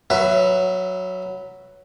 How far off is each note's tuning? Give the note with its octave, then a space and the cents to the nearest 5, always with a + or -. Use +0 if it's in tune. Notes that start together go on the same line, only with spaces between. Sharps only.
F#3 +0 B4 +0 E5 +20